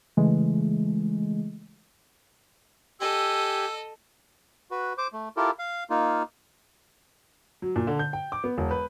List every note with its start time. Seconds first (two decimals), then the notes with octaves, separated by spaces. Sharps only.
0.17 C#3 E3 G#3 A3
3.01 G4 A4 D#5 G#5 E6
4.71 F#4 B4
4.98 C5 D6
5.13 A3
5.37 E4 F4 G4 A4 A#4
5.59 F5
5.90 A#3 D#4 F4
7.62 F#3
7.76 A#2
7.87 D3
7.99 G6
8.13 G5
8.32 D6
8.44 B3
8.58 E1
8.71 B4